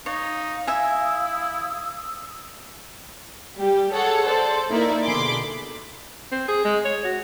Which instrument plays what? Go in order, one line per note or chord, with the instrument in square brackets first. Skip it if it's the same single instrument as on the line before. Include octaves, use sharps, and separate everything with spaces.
[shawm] D#4 [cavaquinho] C#5 [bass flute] F5
[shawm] E4 [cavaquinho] E5 G#5 [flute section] D#6 E6
[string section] G3 G4
G#4 A4 C#5 F#5
A4 C5 D5
A#3 D#4 E4 A#4 D5 E5
B2 D3 G#4 B5 C6 D6
[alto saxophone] C4
G#4
G#3
C#5
F#4